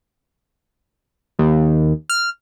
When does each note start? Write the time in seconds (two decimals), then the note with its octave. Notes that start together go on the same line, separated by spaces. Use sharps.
1.39 D#2
2.10 F6